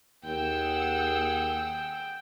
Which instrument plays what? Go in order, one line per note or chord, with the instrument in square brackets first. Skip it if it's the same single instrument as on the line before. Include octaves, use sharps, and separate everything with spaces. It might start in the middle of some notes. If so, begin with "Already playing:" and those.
[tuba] D#2 [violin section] G#4 F#5 E6 [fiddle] G5